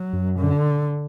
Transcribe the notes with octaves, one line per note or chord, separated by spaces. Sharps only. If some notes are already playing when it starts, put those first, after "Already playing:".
Already playing: F#3
F#2
D3